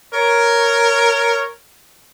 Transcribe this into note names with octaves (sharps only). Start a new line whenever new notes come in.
A#4 C#5